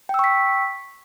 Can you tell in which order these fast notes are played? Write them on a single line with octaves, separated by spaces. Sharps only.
G5 E6 C#6 B6